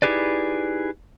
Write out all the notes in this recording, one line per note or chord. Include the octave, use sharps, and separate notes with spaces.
D#4 E4 G4 G#4 B4 D5